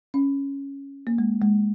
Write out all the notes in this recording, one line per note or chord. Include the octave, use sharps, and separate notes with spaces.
C#4
A#3
G#3
G#3